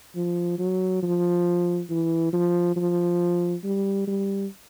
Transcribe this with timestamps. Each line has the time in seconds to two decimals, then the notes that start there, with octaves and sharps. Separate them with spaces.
0.15 F3
0.59 F#3
1.02 F3
1.90 E3
2.33 F3
2.76 F3
3.64 G3
4.07 G3